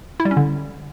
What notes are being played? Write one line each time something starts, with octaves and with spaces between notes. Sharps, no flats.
E4
G3
C#4
D3